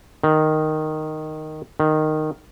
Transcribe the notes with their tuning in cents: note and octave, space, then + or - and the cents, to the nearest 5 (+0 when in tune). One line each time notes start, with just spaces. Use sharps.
D#3 -5
D#3 -10